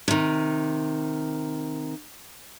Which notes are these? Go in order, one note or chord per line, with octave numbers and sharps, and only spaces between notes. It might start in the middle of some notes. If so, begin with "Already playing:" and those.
C3 D#3